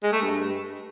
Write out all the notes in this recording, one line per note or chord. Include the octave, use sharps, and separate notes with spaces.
G#3
A3
G2